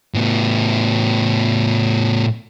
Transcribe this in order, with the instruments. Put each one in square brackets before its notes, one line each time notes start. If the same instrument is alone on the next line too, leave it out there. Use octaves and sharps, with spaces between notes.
[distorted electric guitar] A2 B3